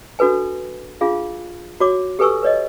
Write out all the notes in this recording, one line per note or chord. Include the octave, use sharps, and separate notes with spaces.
D4 F#4 A4 B4 G#5
D4 F4 G#4 F5
F#4 C#5 D6
G4 A4 B4 G#5 C#6 E6
B4 C#5 D#5